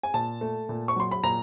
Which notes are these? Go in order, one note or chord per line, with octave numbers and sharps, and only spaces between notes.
G#5
A#2 A5
A3
A#2
C#6
F#3 C6
B5
A#2 A#5